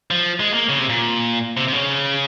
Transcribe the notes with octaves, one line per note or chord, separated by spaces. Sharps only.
F3
G#3
A#3
C#3
C3
A#2
C3
C3
C#3